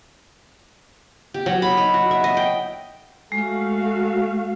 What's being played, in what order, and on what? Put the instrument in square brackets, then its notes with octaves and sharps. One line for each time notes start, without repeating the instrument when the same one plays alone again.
[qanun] G4
F#3
B5
D#4
F#4
E5
D#5
G5
[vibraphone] G#3 [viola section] A3 F#4 F5